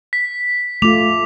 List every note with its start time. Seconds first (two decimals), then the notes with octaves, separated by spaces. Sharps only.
0.13 B6
0.82 A3 F4 D6 F7